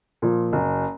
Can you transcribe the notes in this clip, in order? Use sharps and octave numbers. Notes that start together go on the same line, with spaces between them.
A#2 F3
F#1